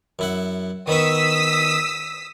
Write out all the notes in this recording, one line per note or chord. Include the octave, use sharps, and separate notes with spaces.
F#2 E4 F#5
D#3 B3 C#6 D#6 E6 B6